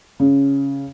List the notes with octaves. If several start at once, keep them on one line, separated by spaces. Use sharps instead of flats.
C#3